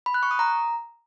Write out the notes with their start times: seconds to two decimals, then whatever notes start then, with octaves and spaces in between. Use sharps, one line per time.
0.06 B5
0.14 F#6
0.23 C#6
0.31 D#6
0.39 A#5